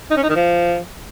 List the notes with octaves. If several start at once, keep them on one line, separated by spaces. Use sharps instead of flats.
D#4
C#4
D#4
D#3
F3